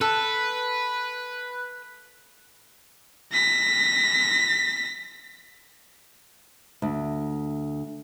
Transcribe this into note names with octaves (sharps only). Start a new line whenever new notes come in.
A4 B4
A#6 B6
D2